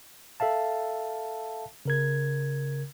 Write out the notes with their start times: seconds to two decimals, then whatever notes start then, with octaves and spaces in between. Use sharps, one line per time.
0.40 A4 E5 F5 A5
1.85 C#3 A#4 G#6